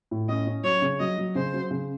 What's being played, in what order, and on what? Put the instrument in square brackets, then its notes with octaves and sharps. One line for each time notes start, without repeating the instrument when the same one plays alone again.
[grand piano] A2
[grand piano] C#4 [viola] D#5
[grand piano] C#4
[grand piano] F#3 [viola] C#5
[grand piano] C#3
[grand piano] F#3 [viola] D#5
[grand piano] F#3
[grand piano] C#3 [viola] C5
[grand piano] F#3
C#3